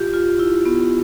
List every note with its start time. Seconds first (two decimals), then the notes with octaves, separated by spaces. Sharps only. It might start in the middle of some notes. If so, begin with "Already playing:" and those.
Already playing: F4 G4
0.13 F4
0.39 E4
0.66 B3